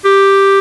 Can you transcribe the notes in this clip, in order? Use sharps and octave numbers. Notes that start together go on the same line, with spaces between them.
G4